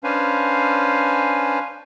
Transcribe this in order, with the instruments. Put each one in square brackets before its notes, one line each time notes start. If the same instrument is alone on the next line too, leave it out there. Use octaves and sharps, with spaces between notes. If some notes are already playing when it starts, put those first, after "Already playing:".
[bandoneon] C#4 D4 B4 C5 F5 G#5